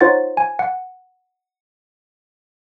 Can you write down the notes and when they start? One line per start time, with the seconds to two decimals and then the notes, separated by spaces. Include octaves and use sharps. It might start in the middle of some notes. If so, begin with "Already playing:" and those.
0.01 D#4 F4 C5 C#5 F#5 A6
0.37 G#5
0.59 F#5